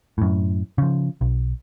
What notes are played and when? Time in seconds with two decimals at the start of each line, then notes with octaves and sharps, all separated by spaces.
0.18 F#2 A2
0.78 C#3 F3
1.21 B1